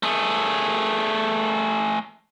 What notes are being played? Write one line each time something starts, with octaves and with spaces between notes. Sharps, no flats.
A3 G#4